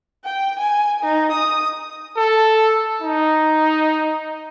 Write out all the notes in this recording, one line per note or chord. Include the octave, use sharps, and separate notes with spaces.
G5
G#5
D#4
D#6
A4
D#4